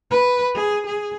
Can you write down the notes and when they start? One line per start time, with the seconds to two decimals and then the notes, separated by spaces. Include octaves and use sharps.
0.11 B4
0.55 G#4
0.86 G#4